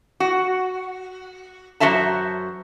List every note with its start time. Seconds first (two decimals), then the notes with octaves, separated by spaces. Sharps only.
0.20 F#4
1.80 F#2 A#3 F#4 C5 E5 A5